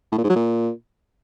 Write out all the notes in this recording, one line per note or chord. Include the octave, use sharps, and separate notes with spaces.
A2
A#2
G#2
F#3
A#2